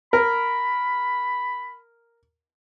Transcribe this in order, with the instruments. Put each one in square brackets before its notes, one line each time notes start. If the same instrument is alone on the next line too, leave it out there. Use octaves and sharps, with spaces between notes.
[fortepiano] A#4 [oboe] B5